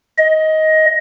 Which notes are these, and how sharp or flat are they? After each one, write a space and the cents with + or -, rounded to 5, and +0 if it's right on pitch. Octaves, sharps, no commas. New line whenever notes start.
D#5 +15